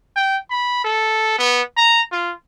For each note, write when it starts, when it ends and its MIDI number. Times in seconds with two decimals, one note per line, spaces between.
0.16 0.37 79
0.51 0.81 83
0.85 1.38 69
1.39 1.62 59
1.77 2.02 82
2.12 2.33 65